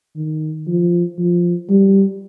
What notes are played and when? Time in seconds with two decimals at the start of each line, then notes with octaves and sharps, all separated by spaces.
0.16 D#3
0.68 F3
1.19 F3
1.70 G3